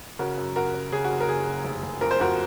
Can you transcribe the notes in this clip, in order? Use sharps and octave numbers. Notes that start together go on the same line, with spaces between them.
C#3 F#4 A#4
F#2
F#2 F#4 A#4
F#2
C#3 G#4
F#4
F#1
A#4
F#1 G#4
F#1
F1
F1
F2 A#4
C5
F2 F#4 A#4